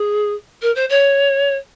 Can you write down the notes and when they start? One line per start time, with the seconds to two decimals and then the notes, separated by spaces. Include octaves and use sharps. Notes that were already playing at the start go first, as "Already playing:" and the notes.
Already playing: G#4
0.62 A#4
0.75 C5
0.89 C#5